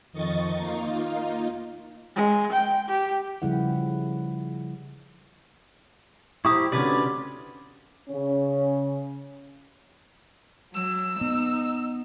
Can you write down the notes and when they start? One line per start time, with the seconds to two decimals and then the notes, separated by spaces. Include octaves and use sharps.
0.13 F2 D#3 D#5 C#6 A6
0.58 A#3 D#4 F4
2.16 G#3
2.52 G5
2.89 G4
3.42 C#3 F3 G3 E4 F#5
6.45 E4 G4 C5 A#5 C#6 D#6
6.72 D2 C3 C#4 B4 D5
8.09 C#3 C#4
10.74 F#3 E6
11.21 B3 D#4